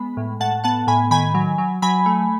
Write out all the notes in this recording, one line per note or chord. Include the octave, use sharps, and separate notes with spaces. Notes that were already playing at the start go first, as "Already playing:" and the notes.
Already playing: G#3 B3 B5
A2
A2 F#5 A5
B3 F#5 A5
A2 G#5 B5
D#3 G#5 B5
F#3
F#3
F#3 G#5 B5
A3